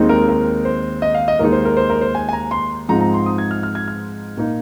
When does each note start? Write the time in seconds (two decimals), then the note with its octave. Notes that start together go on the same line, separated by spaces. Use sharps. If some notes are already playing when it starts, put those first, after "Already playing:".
Already playing: D#2 D#3 G#3 C4 D#4
0.09 A#4
0.29 A#4
0.65 C5
1.02 D#5
1.14 F5
1.28 D#5
1.39 D#2 D#3 G#3 D#4 A#4
1.52 C5
1.65 A#4
1.77 C5
1.90 A#4
2.01 C5
2.15 G#5
2.29 G#5
2.33 A#5
2.51 C6
2.89 G#2 F3 G#3 C4 D#4 A#5
3.01 A#5
3.14 C6
3.26 D#6
3.38 G#6
3.51 F6
3.63 F6
3.75 G#6
3.88 F6
4.37 A#2 A#3 D#4